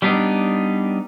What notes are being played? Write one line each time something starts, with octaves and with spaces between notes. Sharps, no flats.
G3 B3 D4 D#4